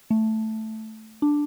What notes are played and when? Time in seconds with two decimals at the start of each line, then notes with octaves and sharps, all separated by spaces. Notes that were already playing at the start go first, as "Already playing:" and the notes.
0.10 A3
1.22 D4